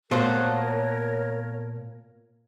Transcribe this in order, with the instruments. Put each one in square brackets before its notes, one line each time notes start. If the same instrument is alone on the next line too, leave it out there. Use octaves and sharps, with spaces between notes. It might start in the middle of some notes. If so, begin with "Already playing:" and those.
[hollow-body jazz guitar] A#2 C5 [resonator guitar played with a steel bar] A3 B3 F#4 [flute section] A#4 C#5